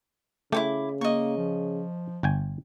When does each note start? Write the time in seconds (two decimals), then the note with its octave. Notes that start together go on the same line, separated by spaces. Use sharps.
0.52 C#3 A3 E4 C#5 G5 D6
1.01 A#3 D#5 C#6
1.37 F3
2.23 G1 G5 G#5